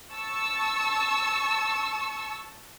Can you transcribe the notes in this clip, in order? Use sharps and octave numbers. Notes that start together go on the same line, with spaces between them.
A5 C#6 E6